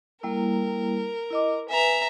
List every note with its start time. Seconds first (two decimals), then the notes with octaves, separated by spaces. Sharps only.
0.23 G3 A#3 E4 A#4
1.31 E4 D#5 D6
1.69 B4 E5 G#5 A#5